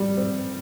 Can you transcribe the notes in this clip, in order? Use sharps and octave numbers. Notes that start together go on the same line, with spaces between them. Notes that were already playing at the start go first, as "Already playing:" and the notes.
Already playing: G3
C4